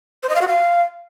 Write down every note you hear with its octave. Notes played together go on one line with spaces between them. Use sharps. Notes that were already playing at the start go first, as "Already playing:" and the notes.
C5
D#5
F5
F#4
F5